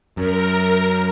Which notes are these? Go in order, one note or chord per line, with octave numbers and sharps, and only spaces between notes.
F#2 A#4